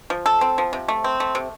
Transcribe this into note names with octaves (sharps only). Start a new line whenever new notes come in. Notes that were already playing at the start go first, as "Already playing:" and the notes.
F3
A4
C4
F3
C3
A3
C4
A3
C3